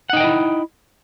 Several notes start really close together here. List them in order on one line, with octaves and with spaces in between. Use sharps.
F#5 D#4 G5 D#5 E4